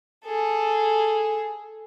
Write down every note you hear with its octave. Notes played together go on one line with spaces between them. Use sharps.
G#4 A4